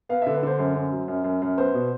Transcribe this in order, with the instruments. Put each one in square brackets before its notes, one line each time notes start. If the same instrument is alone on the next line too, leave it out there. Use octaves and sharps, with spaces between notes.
[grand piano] B3 F5
D3 E5
B4
D3 C5
F#2 C5
F#2
F#3
F#2
F#2
F#2
B3 C5
B2